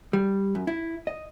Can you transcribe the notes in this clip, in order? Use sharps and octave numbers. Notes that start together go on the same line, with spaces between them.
G3
F#2
E4
D#5